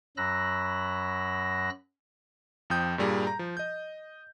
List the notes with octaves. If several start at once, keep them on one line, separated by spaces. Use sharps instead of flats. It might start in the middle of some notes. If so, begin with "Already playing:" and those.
F#2 F#3 B5 E6 F#6 A#6
F2 F3 G5 D#6 G6
G2 A#2 G3 G#4 A#5
A#5
F3
D#5 G6